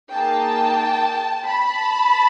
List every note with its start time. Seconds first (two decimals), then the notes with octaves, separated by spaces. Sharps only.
0.12 A#3 D#4 G#4 G5 A5
1.44 A5 B5